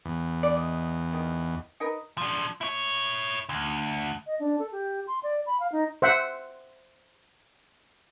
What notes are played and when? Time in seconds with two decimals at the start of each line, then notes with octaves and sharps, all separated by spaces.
0.05 E2
0.43 D5
0.57 D#5
1.13 D#3
1.80 D#4 A#4 B4
2.18 F3 D4
2.61 E4 C#5
3.49 D2
4.26 D#5
4.39 D4
4.59 A4
4.72 G4
5.07 C6
5.23 D5
5.46 B5
5.60 F5
5.72 D#4
6.02 C5 E5 F#5